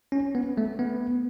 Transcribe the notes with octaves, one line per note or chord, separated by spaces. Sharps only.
C#4
B3
A3
B3